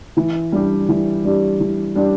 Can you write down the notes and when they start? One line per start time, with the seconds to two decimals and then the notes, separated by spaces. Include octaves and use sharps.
0.17 E3
0.52 G3 D4 G4
0.89 E3
1.24 G3 D4 G4
1.60 E3
1.95 G3 D4 G4